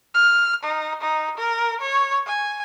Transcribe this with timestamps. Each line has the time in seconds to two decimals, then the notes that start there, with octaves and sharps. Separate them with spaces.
0.14 F6
0.63 D#4
1.01 D#4
1.37 A#4
1.81 C#5
2.26 G#5